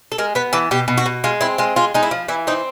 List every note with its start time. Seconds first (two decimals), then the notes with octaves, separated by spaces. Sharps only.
0.12 A4
0.18 G#3 A#4
0.35 B3 B4
0.53 E3 A4
0.71 B2 G4
0.88 B2
0.98 F#4
1.06 B2
1.24 G#3 F4
1.41 C4 E4
1.58 G#3 F4
1.76 G#3 F4
1.94 G#3 D#4
2.03 E4
2.11 F3
2.28 E3 E4
2.47 C4 D#4